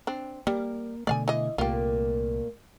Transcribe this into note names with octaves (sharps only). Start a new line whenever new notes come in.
C4 D4
G3 A#3 A#4
B2 D3 A3 D5 F5 G#5
E3 D#5
C2 A#2 A3 A#3 F4 G4